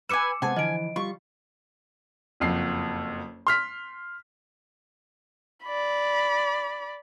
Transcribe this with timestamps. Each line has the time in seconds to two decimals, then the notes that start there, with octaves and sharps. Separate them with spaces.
0.09 B4 G#5 D6 E6 C#7 E7
0.42 C3 G#3 B3 C5 F#5 G#5 A5
0.56 D3 E3 F3 D#5 D7
0.96 G3 F4 C#6
2.40 F#1 F2 C7
3.47 C6 F6 B6
5.65 D5 B5